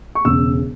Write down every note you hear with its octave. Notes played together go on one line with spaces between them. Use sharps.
C#6
E1 E2 C#3 E6